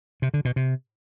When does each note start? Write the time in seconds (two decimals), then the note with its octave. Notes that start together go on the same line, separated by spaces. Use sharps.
0.22 C3
0.34 D3
0.45 B2
0.56 C3